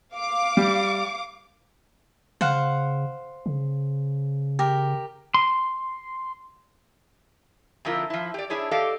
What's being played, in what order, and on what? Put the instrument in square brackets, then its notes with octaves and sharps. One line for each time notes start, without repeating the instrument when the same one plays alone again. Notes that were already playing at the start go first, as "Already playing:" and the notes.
[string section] F5 D6
[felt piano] G3
[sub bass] C#3 [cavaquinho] C5 F5 F#5
[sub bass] C#3
[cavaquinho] G4 A#4
[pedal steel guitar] C6
[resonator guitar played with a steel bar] F2 D3 E4 F4 A#4
F3 E4
G4 D5
D4 E4 G#4 C#5
G4 A4 D5 D#5 F5